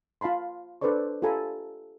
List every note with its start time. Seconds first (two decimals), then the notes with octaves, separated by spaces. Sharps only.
0.21 F4 F5 A5 B5 C6
0.81 D4 A4 B4 C5 D5 C#6
1.22 F4 G4 A4 G#5 A#5 B5